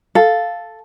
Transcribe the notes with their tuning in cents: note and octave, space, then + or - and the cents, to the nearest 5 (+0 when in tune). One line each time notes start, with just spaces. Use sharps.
A4 +0 F5 +0 A5 +0